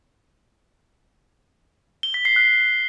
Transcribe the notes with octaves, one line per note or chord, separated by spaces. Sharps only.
G7
B6
C7
F#6